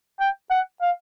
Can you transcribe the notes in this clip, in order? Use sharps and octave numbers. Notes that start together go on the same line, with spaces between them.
G5
F#5
F5